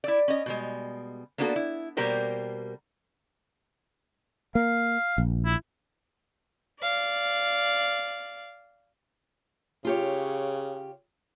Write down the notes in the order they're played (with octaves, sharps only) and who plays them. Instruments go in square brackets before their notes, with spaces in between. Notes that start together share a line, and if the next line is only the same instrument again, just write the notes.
[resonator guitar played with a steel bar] E4 D5
C#4 D#5
B2 G3 G#3
A#3 B3 D4 F#4 A4
E4
B2 G3 A#3 G4 A#4 C5
[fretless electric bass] A#3 [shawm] F5
[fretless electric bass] A#1
[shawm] E4
[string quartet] D5 F5
[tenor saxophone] C#3 [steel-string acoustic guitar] F4 G4 C#5